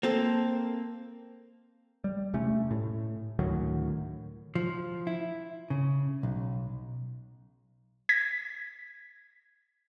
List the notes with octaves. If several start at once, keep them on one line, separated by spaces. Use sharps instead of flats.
A#3 C4 A4
G3
E1 C3 A3 C#4
A2
D2 A2 D#3 F#3
F3
E4
C#3
B1
G#6 A#6 B6